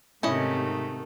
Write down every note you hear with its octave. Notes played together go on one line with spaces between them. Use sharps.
G#2 C3 D#3 A3 C#4 E4 D#5